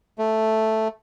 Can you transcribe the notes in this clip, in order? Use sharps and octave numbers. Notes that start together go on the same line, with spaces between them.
A3